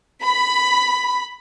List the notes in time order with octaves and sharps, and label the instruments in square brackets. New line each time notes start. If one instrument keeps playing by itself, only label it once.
[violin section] B5